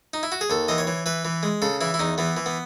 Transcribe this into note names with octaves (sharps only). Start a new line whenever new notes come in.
D#4
E4
F#4
G#4
D#2 A4
E3 D#5
C#5
E3
E3 B4
E3
G#3
C#3 A4
E3 E4
E4
E2 D#4
E3 B3
E3
B3